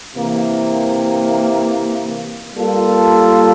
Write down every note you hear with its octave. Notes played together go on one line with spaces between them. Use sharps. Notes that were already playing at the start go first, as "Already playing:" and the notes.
C3 E3 A#3
G3 A#3 F4 A4